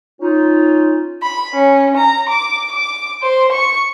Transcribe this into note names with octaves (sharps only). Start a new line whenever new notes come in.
C#4 D#4 F4
B5
C#4
A#5
D6
D6
C5
C#6